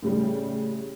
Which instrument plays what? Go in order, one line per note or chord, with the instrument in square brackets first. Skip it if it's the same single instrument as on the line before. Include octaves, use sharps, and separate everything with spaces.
[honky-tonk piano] A2 C#3 G3